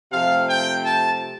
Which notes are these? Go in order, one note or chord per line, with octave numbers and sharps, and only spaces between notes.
C3 F3 A3 F5
G5
A5